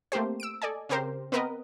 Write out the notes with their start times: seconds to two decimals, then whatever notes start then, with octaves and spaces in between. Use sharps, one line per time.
0.12 A3 A#3 C4 G4 C5
0.40 E6 D7
0.62 A4 D5 D#5 G#5
0.89 C#3 C4 G4 A#4 C5
1.32 B3 C4 A#4 B4 D#5